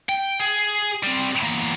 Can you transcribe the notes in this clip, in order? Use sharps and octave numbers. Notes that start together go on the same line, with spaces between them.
G5
G#4
G3 C4
E2 A#3